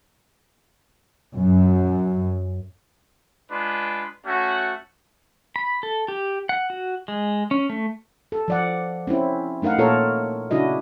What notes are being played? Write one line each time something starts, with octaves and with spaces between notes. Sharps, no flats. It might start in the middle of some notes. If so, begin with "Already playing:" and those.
F#2
G#3 D4 F4 B4
A3 C#4 F#4
B5
A4
G4
F#5
F#4
G#3
C#4
A3
A4
F3 D5 F#5
C4 C#4 E4
A3 D#4 A#4 F5 F#5
A#2 A#3 F4 A4 A#4 C#5
C#3 D4 E4 F#4 D#5